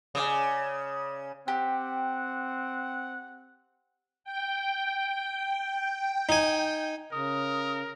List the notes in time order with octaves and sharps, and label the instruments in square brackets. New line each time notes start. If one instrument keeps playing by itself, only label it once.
[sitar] C#3 [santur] C#4 D5 D#5
[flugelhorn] C4 [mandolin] G4 [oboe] F#5
[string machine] G5
[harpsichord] D#4 G#5
[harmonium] C#3 [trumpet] A#4 [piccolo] D#6